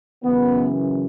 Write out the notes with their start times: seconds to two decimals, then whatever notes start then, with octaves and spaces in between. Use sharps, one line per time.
0.24 F#2 C#3 E3 B3